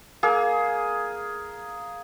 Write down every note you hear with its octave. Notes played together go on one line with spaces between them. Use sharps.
A#3 G#4